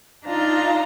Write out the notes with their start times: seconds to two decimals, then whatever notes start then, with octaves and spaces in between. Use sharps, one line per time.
0.24 D4 D#4 F4 A#5